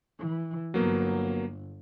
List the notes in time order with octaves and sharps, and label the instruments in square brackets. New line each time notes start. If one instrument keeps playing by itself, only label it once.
[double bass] E3
[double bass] G1 [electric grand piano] F#3 A#3 B3